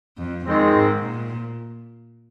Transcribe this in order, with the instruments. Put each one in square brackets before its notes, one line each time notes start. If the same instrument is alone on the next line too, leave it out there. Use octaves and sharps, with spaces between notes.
[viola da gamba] F2
[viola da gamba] F2 [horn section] D#3 G#3 C4
[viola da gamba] G#2
A#2